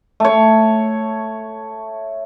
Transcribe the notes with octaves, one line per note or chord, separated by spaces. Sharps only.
A3 C#5